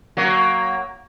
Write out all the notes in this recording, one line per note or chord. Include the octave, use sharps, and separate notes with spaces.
F#3 A#3